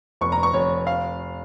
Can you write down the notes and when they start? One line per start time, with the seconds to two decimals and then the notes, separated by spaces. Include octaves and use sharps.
0.21 F1 C#6
0.32 A#5
0.43 C#6
0.53 F1 C#5
0.87 F5